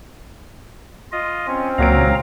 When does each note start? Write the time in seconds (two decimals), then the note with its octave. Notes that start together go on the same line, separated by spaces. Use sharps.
1.12 F4 D#5
1.48 C4 C#4
1.78 C#2 A#2 F#3 F5 A#5 D7